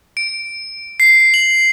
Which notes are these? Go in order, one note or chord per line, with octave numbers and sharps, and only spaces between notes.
D7
C7
F#7